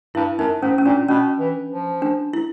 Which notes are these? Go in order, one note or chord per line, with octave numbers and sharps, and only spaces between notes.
G2 E4
F#2 D#4
G#2 C#4
C#4
A#2 D4
B2 C#4
E3
F3
D4
E4